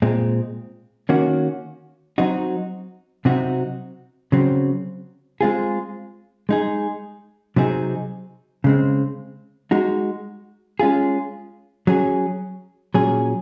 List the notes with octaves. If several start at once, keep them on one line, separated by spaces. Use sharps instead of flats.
A#2 G#3 C4
D#3 A#3 C#4 F#4
F#3 C4 D#4 F#4
C3 F#3 C4 D#4 F#4
C#3 F#3 C4
G#3 C4 F4 G#4
G#3 D#4 G#4
C3 F#3 C4 D#4 G#4
C#3 G#3 C4
G#3 D#4 F#4
G#3 C#4 F4 G#4
F#3 C#4 G#4
A#2 F#3 C#4 G#4